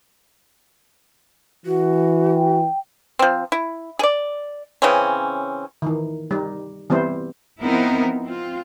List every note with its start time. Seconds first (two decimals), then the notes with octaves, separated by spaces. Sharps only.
1.66 E3 F#4
2.35 G5
3.19 F3 C4
3.52 E4
3.99 G#4 D5
4.82 C#3 E3 C4 C#4
5.82 D#3 E3
6.31 G3 D#4
6.90 E3 G3 B3 C4 E4 C5
7.61 F3 B3 C4 D#4 E4 A#4
8.25 C4 F4